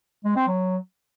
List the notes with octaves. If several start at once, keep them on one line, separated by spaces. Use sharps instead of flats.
G#3
C4
F#3